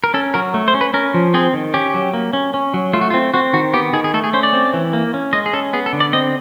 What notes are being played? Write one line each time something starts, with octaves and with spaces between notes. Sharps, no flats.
A#4
C#4 A4
F#3 A#4
A3
C5
C#4
B4
C#4 A#4
F3
C4 G#4
D#3
C#4 G4
F#3
A#3
C#4
C#4
F#3
A3 F4
F#4
F4
C4
C4 F#4
D#3 F#4
B3 G4
D#3 G#4
G#4
A3 A4
G#4
C#4 C5
D5
C4
E3
A#3
C#4
G#3 D#5
G#4
C#4 A4
B3 G#4
A4
D3
D5
C4 D#5